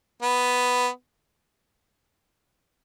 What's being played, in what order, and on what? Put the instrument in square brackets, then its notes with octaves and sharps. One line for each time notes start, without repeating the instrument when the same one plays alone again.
[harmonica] B3